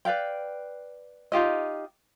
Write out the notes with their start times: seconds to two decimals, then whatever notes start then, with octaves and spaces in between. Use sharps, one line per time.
0.05 B4 D5 F5 G5
1.32 D#4 F4 G4 D#5